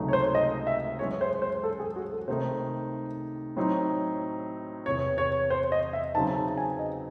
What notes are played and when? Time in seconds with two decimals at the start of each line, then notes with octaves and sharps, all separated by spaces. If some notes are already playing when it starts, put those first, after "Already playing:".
Already playing: C#2 C3 F#3 A3 D#4
0.08 C#5
0.13 C5
0.35 D#5
0.67 E5
0.99 F#2 E3 G#3 C#5
1.21 C5
1.42 C5
1.63 A4
1.80 G#4
1.96 F#4
2.12 A4
2.27 C3 D#3 A3 D#4 C5
3.56 A2 F#3 C4 D#4
4.86 E2 C3 E3 C#5
5.18 C#5
5.50 C5
5.72 D#5
5.93 E5
6.15 C#3 F#3 C4 D#4 A5
6.36 A5
6.58 G#5
6.79 D#5